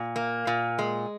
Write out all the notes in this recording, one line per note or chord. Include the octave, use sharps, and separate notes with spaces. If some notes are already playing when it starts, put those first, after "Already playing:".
Already playing: A#2
A#3
A#2
G#3